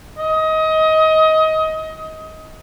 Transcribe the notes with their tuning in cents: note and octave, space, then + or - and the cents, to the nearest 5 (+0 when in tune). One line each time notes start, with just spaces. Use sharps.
D#5 +25